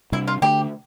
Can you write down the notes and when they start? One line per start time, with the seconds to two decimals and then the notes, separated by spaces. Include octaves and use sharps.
0.12 C3 G3 D4 E4
0.28 F4
0.42 D3 A3 D4 G4